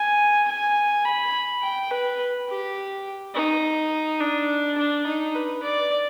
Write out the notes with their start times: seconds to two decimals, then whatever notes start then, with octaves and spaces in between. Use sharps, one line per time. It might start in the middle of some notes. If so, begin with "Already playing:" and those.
Already playing: G#5
0.48 G#5
1.05 B5
1.62 G5
1.91 B4
2.48 G4
3.34 D#4
4.20 D4
4.78 D4
5.06 D#4
5.35 B4
5.63 D5